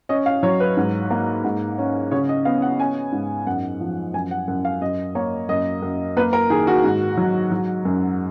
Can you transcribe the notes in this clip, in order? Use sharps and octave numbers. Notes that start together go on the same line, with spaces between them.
C#4 D#5
F5
F#3 C#5
B4
G#2
A#3
G#2
C#4
C#3 C#5
D#5
B3 F5
F#5
C#4 G#5
G#2
F#2 F#5
F3
F#2 G#5
F#5
F#2 F#5
F5
F#2 D#5
A#3 C#5
F#2 D#5
F#2
A#3 B4
A#4
D#3 G#4
F#4
G#2
F#3
F#3
F#2